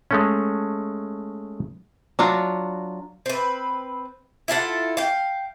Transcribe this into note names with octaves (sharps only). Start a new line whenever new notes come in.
G#3 A3 C#4
F#3 D4 F4 F#4
C4 B4
E4 F4 A4 F#5
F5 G5